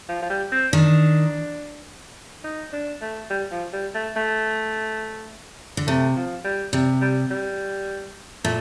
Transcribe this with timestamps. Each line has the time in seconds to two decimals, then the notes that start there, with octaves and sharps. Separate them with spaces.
0.09 F3
0.22 F3
0.30 G3
0.52 C4
0.73 D#3 D4
2.44 D#4
2.73 D4
3.01 A3
3.30 G3
3.51 F3
3.73 G3
3.94 A3
4.16 A3
5.77 D3
5.87 C3 A3
6.16 F3
6.45 G3
6.73 C3 G3
7.01 G3
7.31 G3
8.44 A#2 A3